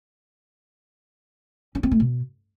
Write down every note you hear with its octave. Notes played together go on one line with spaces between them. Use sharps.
C#4
C4
A3
B2